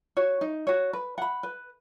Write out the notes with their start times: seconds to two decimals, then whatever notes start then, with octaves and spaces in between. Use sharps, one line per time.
0.17 F#4 C#5
0.41 D#4
0.67 F#4 C#5
0.93 B4
1.18 F#5 B5
1.43 B4